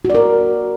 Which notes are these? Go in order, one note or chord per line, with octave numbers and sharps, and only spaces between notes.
F#4 A#4 D5